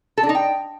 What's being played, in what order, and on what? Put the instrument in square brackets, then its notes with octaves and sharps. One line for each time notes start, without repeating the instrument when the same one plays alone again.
[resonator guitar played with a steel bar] A4
D4
D#4
G5